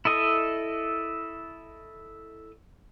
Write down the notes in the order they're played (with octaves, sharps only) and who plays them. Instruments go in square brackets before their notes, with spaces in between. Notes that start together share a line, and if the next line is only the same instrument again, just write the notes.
[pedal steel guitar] E4 A4 D#5 E5